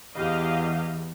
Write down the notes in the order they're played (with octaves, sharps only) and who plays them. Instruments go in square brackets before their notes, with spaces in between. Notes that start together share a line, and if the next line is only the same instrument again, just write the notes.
[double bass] E2 [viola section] G4 D#5 F5